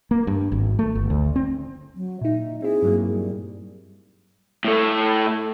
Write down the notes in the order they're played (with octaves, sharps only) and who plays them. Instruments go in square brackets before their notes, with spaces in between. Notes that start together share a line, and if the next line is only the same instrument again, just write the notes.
[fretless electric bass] A#3
G2
G#1
A3
G1
D2
C4
[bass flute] F#3
[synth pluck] A#2 D#4 [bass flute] E5
[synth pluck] C4 E4 [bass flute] G#4
[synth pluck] G2 F#3 A#3
[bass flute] G3
[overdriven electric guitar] A2 A3